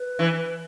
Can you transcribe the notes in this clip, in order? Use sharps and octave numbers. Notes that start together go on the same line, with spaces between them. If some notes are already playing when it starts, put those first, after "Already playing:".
Already playing: B4
E3